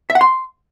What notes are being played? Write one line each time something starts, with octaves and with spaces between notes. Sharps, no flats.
E5
F#5
C6